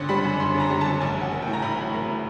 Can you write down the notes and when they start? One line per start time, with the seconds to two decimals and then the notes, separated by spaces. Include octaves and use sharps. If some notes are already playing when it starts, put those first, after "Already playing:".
Already playing: G1 D3 C6
0.09 G3 B5
0.24 F#2
0.40 G1 C6
0.55 D3
0.60 A#5
0.70 G3
0.81 F#2 A5
1.00 A1 G#5
1.17 F#3 F#5
1.31 A#3
1.42 G5
1.47 A2
1.53 A#5
1.62 A1 B5
1.78 F#3
1.94 A#3
2.09 A2